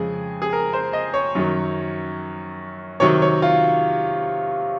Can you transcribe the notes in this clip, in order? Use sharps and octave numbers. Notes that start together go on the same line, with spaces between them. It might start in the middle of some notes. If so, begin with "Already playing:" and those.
Already playing: F2 C#3 G#3 G#4
G#4
A#4
C5
D#5
C#5
F#2 D#3 F#3
C3 D#3 F#3 C#5
C#5
F4